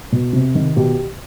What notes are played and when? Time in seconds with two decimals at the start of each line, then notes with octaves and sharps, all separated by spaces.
0.12 B2
0.33 C3
0.55 D#3
0.76 B2 G4